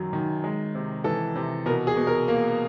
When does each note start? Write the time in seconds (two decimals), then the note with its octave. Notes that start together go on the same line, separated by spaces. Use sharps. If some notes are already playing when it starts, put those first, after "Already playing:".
Already playing: F#2 D#3 F#3
0.13 D#3
0.44 G#3
0.75 C3
1.04 E3 A4
1.36 C3
1.66 B2 A#4
1.87 G#4
1.97 B2
2.07 A#4
2.28 A#3